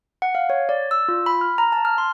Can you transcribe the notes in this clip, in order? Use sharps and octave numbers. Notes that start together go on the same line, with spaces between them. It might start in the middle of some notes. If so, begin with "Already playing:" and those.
F#5
F5
C#5
D5
E6
F4
B5
F6
A#5
A5
F6
C6